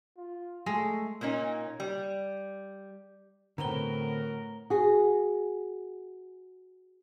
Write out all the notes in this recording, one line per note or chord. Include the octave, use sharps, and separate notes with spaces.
F4
G#3 A3
A#2 A#3 C#4 D#4
G3
A2 D3 B3 C4 F#4 A#4 A#5 G7
F#4 G#4